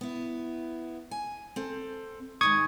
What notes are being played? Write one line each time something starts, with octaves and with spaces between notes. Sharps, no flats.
B3 E4
G#5
C4 A4
G#2 D#3 G#3 C#6 D#6 G#6